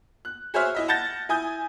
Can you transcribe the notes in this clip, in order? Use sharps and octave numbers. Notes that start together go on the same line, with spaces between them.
F#6
F#4 G#4 C5 C#5 E5 F6
E4 D#5 E5
F#5 A5 G6 A6 A#6
E4 G#5 D#6 G6